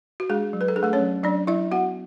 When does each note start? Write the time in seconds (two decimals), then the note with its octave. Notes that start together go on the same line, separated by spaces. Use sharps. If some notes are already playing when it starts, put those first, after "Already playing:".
0.20 F#4
0.29 G#3 D4 G#4
0.53 F#3
0.61 B4
0.68 A4
0.76 D4 G#4
0.83 A3 A4
0.93 C#4 C#5
1.00 F#3
1.23 F#3 D4 D5
1.47 F#3 E4 E5
1.71 B3 F#4 F#5